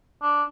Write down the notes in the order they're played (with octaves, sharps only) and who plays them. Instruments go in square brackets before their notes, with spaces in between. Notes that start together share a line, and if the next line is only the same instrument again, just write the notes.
[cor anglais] D4